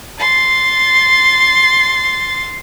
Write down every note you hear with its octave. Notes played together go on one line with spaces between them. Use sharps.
C6 A6